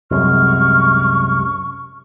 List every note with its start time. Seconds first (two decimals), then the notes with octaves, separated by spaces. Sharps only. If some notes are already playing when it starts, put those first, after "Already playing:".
0.11 C2 F#2 C3 G#3 C#6 F6